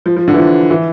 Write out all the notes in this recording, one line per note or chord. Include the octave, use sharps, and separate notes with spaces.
F3
F3
D3
E3
F3
E3